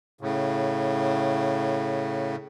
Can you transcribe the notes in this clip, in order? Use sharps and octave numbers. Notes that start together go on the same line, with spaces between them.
A2 C#3